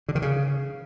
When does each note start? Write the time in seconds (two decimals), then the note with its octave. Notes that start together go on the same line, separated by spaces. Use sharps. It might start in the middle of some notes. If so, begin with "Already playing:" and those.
0.08 D3
0.15 D#3
0.22 C#3